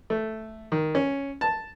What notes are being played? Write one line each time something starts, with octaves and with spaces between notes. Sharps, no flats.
A3
D#3
C#4
A5